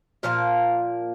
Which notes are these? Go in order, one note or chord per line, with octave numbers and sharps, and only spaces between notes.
A#2 F3 A#3 A#4